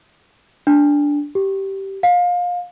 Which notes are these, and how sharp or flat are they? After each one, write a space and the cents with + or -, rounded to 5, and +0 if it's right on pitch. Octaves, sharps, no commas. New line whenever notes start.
D4 -10
G4 -15
F5 +25